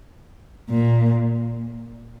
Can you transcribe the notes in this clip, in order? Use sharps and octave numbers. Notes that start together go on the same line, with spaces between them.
A#2